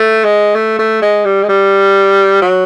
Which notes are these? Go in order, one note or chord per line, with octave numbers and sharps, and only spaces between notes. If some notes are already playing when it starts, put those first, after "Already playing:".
Already playing: A3
G#3
A3
A3
G#3
G3
G#3
G3
F#3